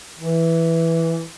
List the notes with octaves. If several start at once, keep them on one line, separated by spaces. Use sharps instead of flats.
E3